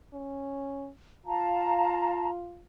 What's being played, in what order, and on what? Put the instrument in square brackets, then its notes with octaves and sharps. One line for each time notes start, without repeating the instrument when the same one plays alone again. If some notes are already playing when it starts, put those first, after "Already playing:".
[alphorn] C#4
[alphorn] F4 [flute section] F5 A5 A#5